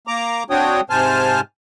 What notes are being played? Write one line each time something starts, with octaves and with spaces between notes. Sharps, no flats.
A#3 A#5 D6
C4 D4 F#4 C#5 G5 D#6
G#2 C3 C5 G#5 A5 F6